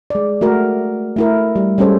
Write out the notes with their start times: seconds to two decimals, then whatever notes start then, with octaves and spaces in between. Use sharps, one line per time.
0.10 G#3 D5
0.41 A3 F#4 A#4
1.16 A3 E4 A#4
1.56 G3
1.78 G3 G#3 C#4 A4 C5 C#5